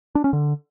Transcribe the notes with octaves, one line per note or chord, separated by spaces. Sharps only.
D4
C#4
D3